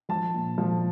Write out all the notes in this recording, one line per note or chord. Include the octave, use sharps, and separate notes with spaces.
F3 A5
A#2
F3